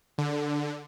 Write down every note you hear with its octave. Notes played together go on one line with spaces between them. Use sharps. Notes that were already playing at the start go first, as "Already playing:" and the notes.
D3